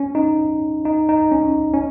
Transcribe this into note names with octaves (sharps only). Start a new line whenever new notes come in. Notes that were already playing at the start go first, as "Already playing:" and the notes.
Already playing: C#4
D#4
D#4
D#4
C#4
C#4